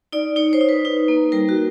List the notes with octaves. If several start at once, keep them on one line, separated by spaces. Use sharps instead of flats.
D#4 D5
D#4 C#5
C5
D#4
B4
D#4
A#3
G3 A#4
F#4